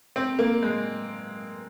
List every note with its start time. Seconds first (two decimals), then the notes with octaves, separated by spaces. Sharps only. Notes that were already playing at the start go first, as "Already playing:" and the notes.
0.16 C4
0.39 A#3
0.63 G#3